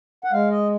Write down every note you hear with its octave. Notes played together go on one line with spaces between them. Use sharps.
F#5
G#3 F5
D#5